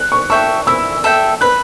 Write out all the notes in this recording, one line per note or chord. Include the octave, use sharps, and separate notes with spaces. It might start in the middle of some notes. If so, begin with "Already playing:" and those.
Already playing: F#6
C#6
A4 E5 G5 C#6
E4 E6
A4 E5 G5
B4 F#6